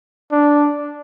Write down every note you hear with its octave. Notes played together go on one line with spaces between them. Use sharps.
D4